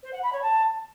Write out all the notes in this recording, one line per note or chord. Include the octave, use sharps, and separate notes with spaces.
C5
F#5
B5
C#5
A5